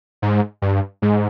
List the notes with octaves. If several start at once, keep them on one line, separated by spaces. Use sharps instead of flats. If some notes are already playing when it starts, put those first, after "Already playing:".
G#2
G2
G#2